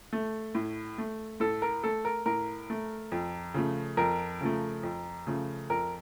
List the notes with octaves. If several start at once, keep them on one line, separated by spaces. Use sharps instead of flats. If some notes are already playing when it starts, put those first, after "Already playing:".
A3
A2
A3
A2 A4
A#4
A3 A4
A#4
A2 A#4
A3
F2
C#3 F3 A3
F2 A#4
C#3 F3 A3
F2
C#3 F3 A3
F2 A#4